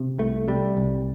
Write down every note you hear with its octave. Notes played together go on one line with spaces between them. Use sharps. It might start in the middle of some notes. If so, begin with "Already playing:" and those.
Already playing: C3
C2 A3
C3 G3
C2